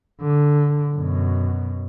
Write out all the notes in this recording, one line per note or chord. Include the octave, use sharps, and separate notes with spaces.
D3
F#2 B2